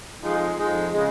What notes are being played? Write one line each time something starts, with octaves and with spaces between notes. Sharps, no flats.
F2 F3 G#3 D#4
F2 F3 G#3 D#4
C#3 G#3